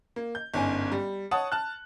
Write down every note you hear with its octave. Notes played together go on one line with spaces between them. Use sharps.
A#3
G6
G1 G#2 C#4 G#5
G3
C#5 F#5 A5 D#6
A5 F6 F#6